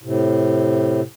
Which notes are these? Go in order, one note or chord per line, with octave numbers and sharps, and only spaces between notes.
A2 C3